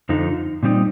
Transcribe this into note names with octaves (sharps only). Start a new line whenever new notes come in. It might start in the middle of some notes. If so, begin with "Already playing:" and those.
F2 D3 F3 D#4
A#2 G3 C4 D#4